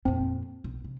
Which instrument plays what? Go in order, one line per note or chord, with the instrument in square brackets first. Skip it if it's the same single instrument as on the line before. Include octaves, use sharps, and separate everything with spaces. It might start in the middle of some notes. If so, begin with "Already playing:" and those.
[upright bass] F2 A#2 [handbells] C4 A5
[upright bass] B1
C3